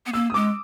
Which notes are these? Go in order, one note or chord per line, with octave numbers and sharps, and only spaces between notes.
B3
A#3 E6
D#6
G#3 D6